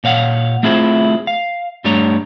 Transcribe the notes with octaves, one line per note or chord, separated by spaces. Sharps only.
A#2 C#5 F5 F#5
A3 C4 E4 F4 G#4 C5
F5
G2 G3 A3 D4 C#5 A#5